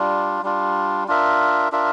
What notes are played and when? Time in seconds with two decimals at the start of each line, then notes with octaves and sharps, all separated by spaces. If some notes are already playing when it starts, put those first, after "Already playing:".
Already playing: G3 D4 F4
0.42 G3 D4 F4
1.08 D4 F4 A#4 E5
1.72 D4 F4 A#4 E5